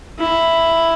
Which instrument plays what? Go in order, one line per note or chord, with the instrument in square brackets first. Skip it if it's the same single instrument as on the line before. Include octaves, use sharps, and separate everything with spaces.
[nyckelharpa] E4